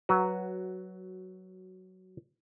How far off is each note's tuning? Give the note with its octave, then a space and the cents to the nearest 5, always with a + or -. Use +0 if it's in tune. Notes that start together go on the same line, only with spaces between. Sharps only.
F#3 +10 F#4 +0 B4 +0